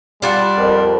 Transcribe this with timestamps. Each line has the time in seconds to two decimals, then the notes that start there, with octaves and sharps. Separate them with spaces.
0.22 G3 D4 F4 F#4
0.57 F2 A#4